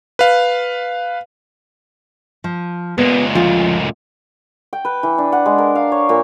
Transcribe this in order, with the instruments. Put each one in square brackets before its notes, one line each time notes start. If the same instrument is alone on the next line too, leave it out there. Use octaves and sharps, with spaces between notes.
[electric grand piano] B4 F5
[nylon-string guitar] F3
[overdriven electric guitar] C#2 A#2 [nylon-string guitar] B3
[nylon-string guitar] D2 [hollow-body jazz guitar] F3 F4
[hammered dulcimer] G5
B4
E3
D4
F#5
G#3
A#4
F5
C#5
A#2